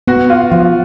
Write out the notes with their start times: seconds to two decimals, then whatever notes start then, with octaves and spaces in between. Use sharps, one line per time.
0.08 B3 F#4
0.30 F4
0.51 F3 F4